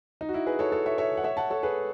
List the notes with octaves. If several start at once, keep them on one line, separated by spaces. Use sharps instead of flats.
D#4
F#4
E4
G#4 B4
A4 C#5
A4 C#5
C#5 E5
C#5 E5
F#5
C#5 E5
F#5 A5
A4 C#5
G#4 B4